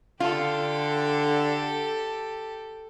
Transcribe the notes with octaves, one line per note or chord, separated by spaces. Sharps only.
D3 F4 G4 A4